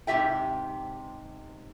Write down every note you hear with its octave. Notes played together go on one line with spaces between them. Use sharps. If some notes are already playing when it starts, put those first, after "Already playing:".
G#2 C3 G4 E5 G5